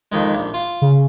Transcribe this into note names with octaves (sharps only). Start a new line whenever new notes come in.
F2 D#3 G#3
A#1
F4
C#3